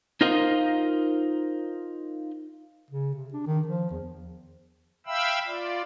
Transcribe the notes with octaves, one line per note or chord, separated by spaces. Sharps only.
D#4 F4 A#4 C5 D#5 F5
C#3
C3
D4
D#3
F3
E2
E5 F5 G5 B5 E6
F4 D5